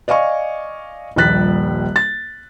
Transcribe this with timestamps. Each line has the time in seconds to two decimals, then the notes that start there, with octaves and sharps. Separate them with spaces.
0.08 D5 D#5 F5 G#5 C#6
1.16 D#1 A#1 G3 F#6 A6 B6
1.96 A6